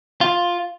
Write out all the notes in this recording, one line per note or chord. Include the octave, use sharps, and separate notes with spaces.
F4